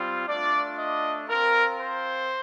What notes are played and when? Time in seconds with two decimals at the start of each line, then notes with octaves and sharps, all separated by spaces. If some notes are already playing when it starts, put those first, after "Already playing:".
Already playing: G3 C4 F4
0.27 A3 D4 F4 D5
0.78 D#5
1.29 C4 F4 A#4
1.80 C5